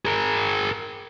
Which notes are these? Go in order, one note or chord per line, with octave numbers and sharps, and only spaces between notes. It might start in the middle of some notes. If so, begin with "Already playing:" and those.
G#4 A#4